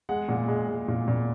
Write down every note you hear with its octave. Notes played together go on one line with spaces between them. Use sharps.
G#3 F#5
A#2
G#3
G#3
A#2
A#2